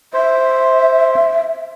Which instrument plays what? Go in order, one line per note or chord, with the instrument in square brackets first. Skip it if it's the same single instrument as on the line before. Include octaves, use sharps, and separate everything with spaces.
[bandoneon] C5 [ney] E5